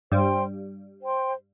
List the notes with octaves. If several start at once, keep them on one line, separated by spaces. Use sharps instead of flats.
G2 G3 C5 G5 C6
C5 G5 C6